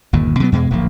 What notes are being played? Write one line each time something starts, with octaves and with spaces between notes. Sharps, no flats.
G1 D#2 A#2
B2 F#3 G#3 B3
E2 B2 G#3
D1 A#1 F3 A#3